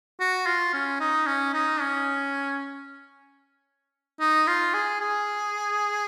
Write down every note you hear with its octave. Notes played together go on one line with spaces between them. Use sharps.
F#4
F4
C#4
D#4
C#4
D#4
C#4
D#4
F4
G#4
G#4